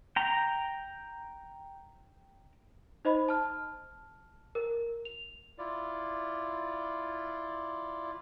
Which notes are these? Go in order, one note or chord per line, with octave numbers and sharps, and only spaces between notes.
G5 A#5
D#4 C5 D#5 B5
A5 F6
A#4
F7
E4 F4 D5